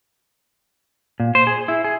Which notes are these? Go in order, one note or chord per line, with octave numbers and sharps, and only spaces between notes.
A#2
C5
G#4
E4
G#4